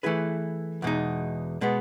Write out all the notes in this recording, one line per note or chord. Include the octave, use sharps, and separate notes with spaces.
E3 A3 E4 G#4 B4
E2 B2 G#3 D#4
B2 G#3 B3